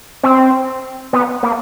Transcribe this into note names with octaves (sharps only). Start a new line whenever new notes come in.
C4
B3
A#3